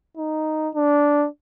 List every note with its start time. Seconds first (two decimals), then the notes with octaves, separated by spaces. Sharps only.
0.17 D#4
0.75 D4